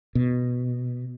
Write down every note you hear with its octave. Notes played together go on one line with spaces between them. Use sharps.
B2